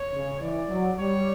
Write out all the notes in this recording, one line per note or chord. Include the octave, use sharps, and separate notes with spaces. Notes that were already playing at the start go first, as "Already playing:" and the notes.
Already playing: C#5
C#3
E3 D5
F#3
G3 C#5